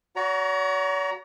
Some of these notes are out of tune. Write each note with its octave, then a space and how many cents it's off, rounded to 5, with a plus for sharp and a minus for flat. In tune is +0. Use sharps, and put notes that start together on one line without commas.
F#4 +5 C#5 +45 A#5 +15